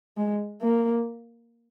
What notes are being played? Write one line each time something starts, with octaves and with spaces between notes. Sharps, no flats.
G#3
A#3